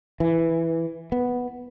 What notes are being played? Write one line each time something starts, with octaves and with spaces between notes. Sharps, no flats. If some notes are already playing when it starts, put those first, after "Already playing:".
E3
B3